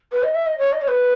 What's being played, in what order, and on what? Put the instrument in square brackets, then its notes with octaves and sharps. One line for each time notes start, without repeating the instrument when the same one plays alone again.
[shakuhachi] B4
D#5
E5
D#5
C#5
D#5
C#5
B4